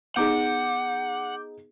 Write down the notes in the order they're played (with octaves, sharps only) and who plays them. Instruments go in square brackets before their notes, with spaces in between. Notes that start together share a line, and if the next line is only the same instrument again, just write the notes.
[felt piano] B3 D#4 G#4 [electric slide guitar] F#5 [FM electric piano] D6 G6